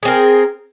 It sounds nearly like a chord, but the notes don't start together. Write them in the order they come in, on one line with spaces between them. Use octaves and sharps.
G#4 C4 A#4